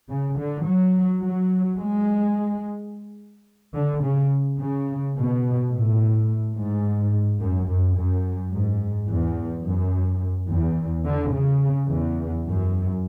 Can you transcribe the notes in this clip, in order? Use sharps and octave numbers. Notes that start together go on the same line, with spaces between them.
C#3
D3
F#3
F#3
G#3
D3
C#3
C#3
B2
A2
G#2
F#2
F#2
F#2
G#2
E2
F#2
E2
D3
C#3
E2
F#2